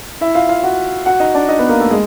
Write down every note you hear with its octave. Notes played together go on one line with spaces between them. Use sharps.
E4 E5
F4 F5
F4 F5
F#4 F#5
F#4 F#5
D#4 D#5
D4 D5
D#4 D#5
B3 B4
A#3 A#4
A3 A4
G#3